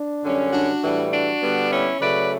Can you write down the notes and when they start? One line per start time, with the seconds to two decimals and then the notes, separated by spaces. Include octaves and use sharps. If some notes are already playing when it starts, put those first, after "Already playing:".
Already playing: D4
0.23 F#2 D3 G3 C#4
0.52 D4 F#4
0.82 A2 E3 G3
1.12 D4 F#4
1.42 D3 G3 B3
1.71 C#4 E4
2.00 C#3 F#3 A3 B4 D5